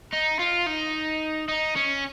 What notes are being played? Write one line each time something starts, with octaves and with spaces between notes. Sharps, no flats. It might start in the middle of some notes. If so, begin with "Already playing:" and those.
D#4
F4
D#4
D#4
C#4